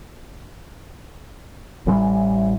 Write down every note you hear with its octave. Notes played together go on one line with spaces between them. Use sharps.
A1 E3 G3